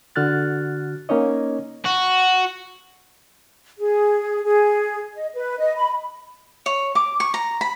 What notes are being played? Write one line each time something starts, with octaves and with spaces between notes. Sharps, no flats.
D3 F#4 F6 F#6 A6
A#3 C#4 D#4 C#5 D#5
F#4
G#4
G#4
D#5
B4
D#5
B5
C#5
D6
C#6
A#5
B5